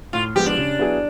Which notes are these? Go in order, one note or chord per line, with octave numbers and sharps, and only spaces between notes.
A2 F4
F3 G#3 B3 G4
D4
C#3
F#3 B3 E4 G#4